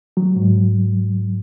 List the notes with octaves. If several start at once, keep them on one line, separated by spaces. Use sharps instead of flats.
F#3
G#2